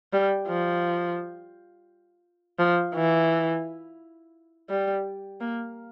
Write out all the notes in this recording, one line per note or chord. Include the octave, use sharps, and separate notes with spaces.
G3
F3
F3
E3
G3
A#3